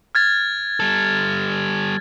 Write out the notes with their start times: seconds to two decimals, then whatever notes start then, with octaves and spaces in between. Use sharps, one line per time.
0.15 F6 G#6 A6
0.80 G3 A4